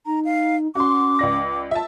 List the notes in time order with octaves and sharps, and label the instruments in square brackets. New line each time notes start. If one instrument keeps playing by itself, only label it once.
[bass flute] D#4 [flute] A#5
[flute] F5
[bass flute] C#4 [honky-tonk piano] F#4 C6 [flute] D6
[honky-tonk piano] C#2 D5 A#6
[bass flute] F4 [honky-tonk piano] E5 A5